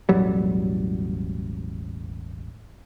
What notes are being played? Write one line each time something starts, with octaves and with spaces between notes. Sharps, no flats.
E1 A1 F#3 G3